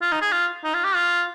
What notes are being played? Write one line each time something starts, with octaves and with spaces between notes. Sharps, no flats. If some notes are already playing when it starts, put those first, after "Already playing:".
F4
D#4
G#4
F4
D#4
F4
G4
F4